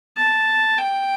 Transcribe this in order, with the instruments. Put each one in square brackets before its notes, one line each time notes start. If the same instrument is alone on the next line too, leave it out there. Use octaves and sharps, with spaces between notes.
[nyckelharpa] A5
G5